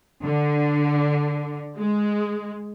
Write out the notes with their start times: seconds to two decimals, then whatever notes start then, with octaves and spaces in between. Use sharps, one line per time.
0.23 D3
1.77 G#3